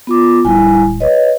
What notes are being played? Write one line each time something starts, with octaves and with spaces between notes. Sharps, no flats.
B3 F4 D6
D1 G3 E4 G#5
B4 C#5 D#5